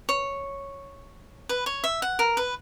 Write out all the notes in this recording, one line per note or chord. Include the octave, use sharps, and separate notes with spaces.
C#5
B4
C#5
E5
F#5
A#4
B4